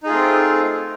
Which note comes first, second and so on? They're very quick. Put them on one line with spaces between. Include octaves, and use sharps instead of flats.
D#4 G#4 F4 A3 C4